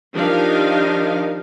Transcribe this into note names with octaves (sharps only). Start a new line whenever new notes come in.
D#3 F3 D4 D#4 G4 F5